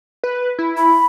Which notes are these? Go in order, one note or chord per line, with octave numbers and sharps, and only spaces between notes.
B4
E4
B5